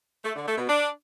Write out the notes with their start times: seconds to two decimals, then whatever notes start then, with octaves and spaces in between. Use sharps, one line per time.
0.24 A3
0.36 D3
0.47 A3
0.58 B2
0.69 D4